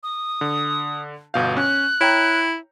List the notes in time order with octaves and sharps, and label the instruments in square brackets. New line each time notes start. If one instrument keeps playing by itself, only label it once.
[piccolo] D#6
[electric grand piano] D3
[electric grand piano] G1 B2 F5 [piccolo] G6
[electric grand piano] C#4 [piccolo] F#6
[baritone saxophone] E4 [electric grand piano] C#5 G5 A#5